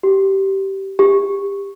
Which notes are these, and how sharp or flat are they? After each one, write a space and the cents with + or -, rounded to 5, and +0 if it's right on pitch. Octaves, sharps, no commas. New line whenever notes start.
G4 -15
G4 +25